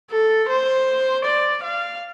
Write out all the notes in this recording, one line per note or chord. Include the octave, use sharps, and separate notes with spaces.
A4
C5
D5
F5